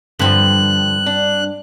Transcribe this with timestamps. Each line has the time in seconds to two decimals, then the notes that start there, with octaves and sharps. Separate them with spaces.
0.19 G2 D3 F3 C4 F#6
1.06 D4